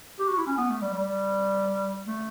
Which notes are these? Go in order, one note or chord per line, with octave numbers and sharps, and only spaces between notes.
G4
F#4
E4
C#4
B3
A3
G3
G3
A3